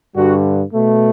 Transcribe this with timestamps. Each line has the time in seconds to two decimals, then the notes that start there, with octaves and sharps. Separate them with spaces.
0.15 G2 D3 G3 F#4
0.73 B2 A3